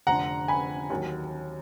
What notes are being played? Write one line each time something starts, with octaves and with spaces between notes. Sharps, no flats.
F1 F2 D3 F#5 A#5
G#5 B5
D#2 D#3 F#3